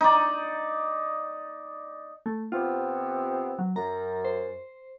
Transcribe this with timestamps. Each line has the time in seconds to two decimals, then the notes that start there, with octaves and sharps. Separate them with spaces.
0.01 D#4 D5
2.26 A3
2.52 C3 B3 C4 F4
3.59 F#3
3.76 F#2 A#5
4.25 C5